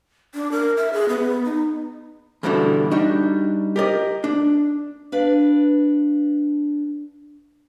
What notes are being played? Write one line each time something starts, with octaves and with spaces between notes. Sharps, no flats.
D4
A#4
E5
G#4
B3
D#4
E2 G2 B2 D3 E3
G3 D4 D#4 F#4
G4 A#4 D5 D#5
D4
D4 B4 F5